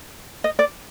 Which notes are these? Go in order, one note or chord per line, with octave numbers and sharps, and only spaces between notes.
D#5
D5